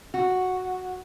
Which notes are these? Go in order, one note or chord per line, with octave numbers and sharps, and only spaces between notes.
F#4